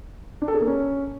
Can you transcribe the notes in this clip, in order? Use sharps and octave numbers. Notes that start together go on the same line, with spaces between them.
D4
A4
G#4
A#3
C#4